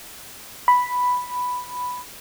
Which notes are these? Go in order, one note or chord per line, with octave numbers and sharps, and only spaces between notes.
B5